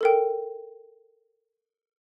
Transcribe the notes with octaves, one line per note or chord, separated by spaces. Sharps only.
A4 A#4 G5